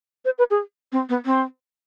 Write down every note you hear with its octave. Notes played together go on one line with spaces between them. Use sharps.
C5
B4
G#4
C4
B3
C4